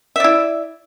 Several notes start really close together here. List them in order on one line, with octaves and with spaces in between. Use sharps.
E5 D5 E4